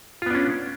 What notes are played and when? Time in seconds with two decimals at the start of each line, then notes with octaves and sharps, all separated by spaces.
0.22 F4
0.26 B3
0.31 D4
0.35 C#4